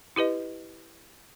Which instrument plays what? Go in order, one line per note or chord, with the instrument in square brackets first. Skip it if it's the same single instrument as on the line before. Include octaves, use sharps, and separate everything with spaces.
[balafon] E4 G4 B4 D#5